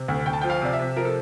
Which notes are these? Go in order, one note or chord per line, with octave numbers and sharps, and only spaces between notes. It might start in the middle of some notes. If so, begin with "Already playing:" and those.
Already playing: C3
D2
D2 G5
A5
F3 G5
F5
C3 D5
E5
C3
F3 A#4
A4